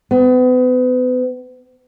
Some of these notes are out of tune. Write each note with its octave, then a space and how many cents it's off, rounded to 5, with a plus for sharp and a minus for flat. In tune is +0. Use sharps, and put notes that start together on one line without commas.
B3 +35